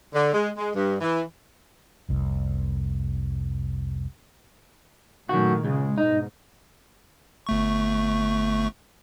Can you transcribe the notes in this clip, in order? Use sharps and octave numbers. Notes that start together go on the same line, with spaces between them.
D3
G#3
G#3
G2
E3
F1 C2
F#2 A#2 D#3 A3 F#4
C#2 C#3 G#3
G#2 B2 D#4
G1 A3 C#6